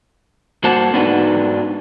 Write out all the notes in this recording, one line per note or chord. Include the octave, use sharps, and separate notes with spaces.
G2 A#3 F#4 C5 F#5 A5
G#2 B3 D4 D#4 F#4 B4